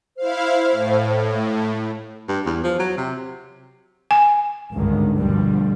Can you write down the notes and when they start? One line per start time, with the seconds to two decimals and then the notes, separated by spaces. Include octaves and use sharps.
0.18 E4 C5 F5
0.71 A2
1.33 A3
2.28 G2
2.46 E2
2.64 F3
2.79 F#3
2.97 C3
4.11 G#5
4.73 G#1 C#2 G2 D3 D#3
5.18 D2 G2 B2 D3 F3 G3